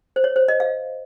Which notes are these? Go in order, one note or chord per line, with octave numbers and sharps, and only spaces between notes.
C5
C#5
C5
D#5
F5